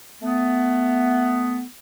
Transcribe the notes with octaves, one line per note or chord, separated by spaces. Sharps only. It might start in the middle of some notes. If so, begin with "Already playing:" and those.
A3 B3